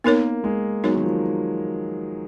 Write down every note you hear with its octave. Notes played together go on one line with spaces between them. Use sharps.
A#3 B3 D#4 A#4 C#5
G#3
F#3 B3 D#4 A#4 C#5
D#3
F3